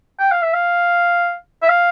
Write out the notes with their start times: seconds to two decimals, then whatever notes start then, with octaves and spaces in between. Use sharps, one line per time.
0.20 G5
0.32 F5
0.42 E5
0.53 F5
1.63 E5
1.69 F5